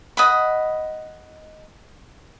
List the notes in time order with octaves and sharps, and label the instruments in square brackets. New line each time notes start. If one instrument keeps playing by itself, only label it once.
[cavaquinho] D#5 F#5 B5